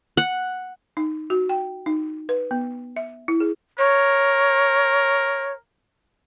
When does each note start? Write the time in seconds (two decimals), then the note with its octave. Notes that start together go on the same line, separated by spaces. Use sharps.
0.17 F#5
0.97 D#4
1.30 F#4
1.49 G5
1.86 D#4
2.29 B4
2.51 B3
2.96 E5
3.28 E4
3.40 G#4
3.78 A#4 C#5